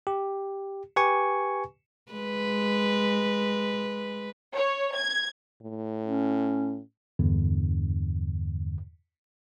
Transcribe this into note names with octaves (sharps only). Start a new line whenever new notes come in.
G4
G4 B4 G#5 C#6
G#3 B4
C#5
G#6
A2
C#4
E2 G2 D3